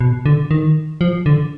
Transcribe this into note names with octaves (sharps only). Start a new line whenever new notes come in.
B2
D3
D#3
F3
D3